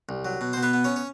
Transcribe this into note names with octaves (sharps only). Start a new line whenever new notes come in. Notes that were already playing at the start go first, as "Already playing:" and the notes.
C2
F#3
B2
B2 C5
B3 B4
B3
C#4 C#5
C#5